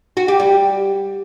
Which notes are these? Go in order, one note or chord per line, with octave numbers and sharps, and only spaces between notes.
F#4
G4
G3